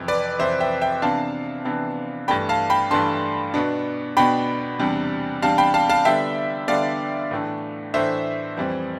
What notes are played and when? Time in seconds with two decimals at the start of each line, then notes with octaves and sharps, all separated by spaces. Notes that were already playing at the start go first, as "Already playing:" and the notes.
Already playing: F2 C3 E3
0.08 B4 D5
0.39 F2 C3 E3 C5 E5
0.60 E5 G5
0.81 E5 G5
1.02 C3 E3 B3 D4 F5 A5
1.65 C3 E3 B3 D4
2.28 G2 E3 A3 D4 G5 B5
2.49 F5 A5
2.70 G5 B5
2.91 G2 E3 A3 D4 A5 C6
3.54 B2 B3 D4
4.17 B2 B3 D4 G5 B5
4.79 E2 C3 G3 D4
5.42 E2 C3 G3 D4 F5 A5
5.58 G5 B5
5.74 F5 A5
5.89 F5 A5
6.05 D3 G3 B3 D4 E5 G5
6.68 D3 G3 B3 D4 D5 F5
7.31 A2 E3 A3 D4
7.94 A2 E3 A3 D4 C5 E5
8.57 F2 E3 G3 C4